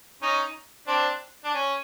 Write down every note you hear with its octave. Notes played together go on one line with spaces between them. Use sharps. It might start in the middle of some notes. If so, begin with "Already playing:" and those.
C#4 D#4
C4 D4
D4
C#4